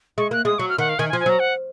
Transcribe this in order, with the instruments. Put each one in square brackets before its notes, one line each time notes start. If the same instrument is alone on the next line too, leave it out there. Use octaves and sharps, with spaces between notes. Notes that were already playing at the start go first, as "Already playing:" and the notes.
[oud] G#3 [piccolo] C#6
[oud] A#3 [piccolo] F#6
[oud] G#3 [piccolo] D#6
[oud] F#3 [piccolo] C#6
[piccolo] F6
[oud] D#3 [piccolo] F#5
[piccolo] F5
[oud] D#3 [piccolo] G#5
[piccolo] G#5
[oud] F3
[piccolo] G#5
[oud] F#3 [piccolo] A#5
[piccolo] F#5